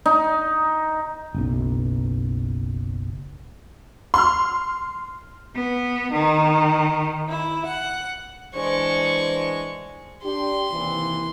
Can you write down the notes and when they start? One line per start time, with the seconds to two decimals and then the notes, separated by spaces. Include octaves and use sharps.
0.06 D#4
1.35 F#1 B1
4.14 C6 F6
5.54 B3
6.12 D#3
7.28 E4
7.66 F#5
8.55 E3 G#3 D4 C5 C#6
10.24 D4 G4 C6
10.72 D#2 C3 E3